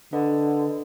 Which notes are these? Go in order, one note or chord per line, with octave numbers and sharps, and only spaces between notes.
D3 D4 B4 D#5